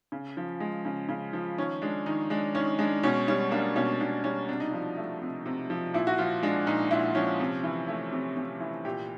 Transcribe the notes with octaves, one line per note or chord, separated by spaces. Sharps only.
C#3
F3
G#3
C#3
C#3
F3
D#3 C#4
G#3 D4
D#3 D#4
G#3 D4
D#3 C#4
G#3 D4
B2 C#4
G3 C#4
A#3 D4
B2 C#4
B2 D4
G3 C#4
C3 D4
D#4
F3 D4
A3
C3
C3
F3
A#2 E4
F#4
F3 F4
G#3 D4
A#2 D#4
A#2 E4
F3 C#4
C3
E3
A3
C3
C3
E3
A#2 G4